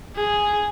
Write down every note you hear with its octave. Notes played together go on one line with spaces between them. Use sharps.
G#4